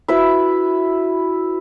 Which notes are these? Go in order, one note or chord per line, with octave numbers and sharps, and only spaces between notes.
E4 F#4 B4 E5